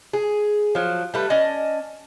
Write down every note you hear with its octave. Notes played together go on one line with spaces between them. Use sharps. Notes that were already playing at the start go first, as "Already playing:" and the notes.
G#4
F3 F#3
G3 A3 B4
C#4 D5 D#5 A5